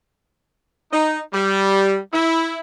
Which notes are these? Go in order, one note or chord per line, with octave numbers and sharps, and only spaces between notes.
D#4
G3
E4